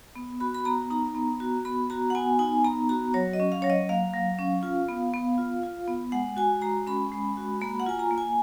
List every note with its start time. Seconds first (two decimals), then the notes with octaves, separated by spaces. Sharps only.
0.16 B3
0.40 F#4 B5
0.55 B5
0.65 B3 A#5
0.90 D#4 A#5
1.15 B3
1.40 F#4
1.65 B3 B5
1.90 F#4 A#5
2.10 F#5
2.15 B3 G#5
2.39 D#4 G#5
2.64 B3 A#5
2.89 F#4 A#5
3.14 F#3 C#5
3.33 D#5
3.40 C#4
3.52 F5
3.62 F#3 C#5
3.70 D#5
3.89 A#3 F5
4.14 F#3
4.39 C#4
4.63 F4
4.89 B3
5.14 B3
5.38 F4
5.63 F4
5.88 B3
6.12 G#3 F#5
6.37 F#4 G#5
6.62 G#3 A#5
6.87 C#4 B5
7.12 G#3
7.37 F#4
7.61 A#3 B5
7.80 F#5
7.87 F4 G#5
7.99 A#5
8.11 A#3
8.18 G#5